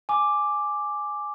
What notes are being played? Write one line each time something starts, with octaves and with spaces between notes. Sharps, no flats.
G#5 D6